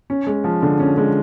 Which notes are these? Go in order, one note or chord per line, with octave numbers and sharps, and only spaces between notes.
C#4
G#3
F3
D3
C#4
G#3